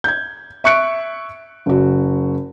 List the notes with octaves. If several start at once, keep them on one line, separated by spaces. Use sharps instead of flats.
G6 G#6
E5 C#6 F#6 C#7 D7
F#1 F#4